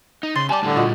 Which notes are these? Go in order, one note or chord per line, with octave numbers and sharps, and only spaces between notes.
D#4
C#3 C6 A6
G4 D5 G#5 A5 D6
A2 D3 G3
A#2 F4 F#4 D#5